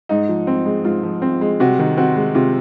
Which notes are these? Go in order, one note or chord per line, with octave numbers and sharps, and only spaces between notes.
G#2 D#4
F3
C4
G#3
G#2 F4
F3
C4
G#3
C3 F#4
D#3
C4 F#4
G#3
C3 F4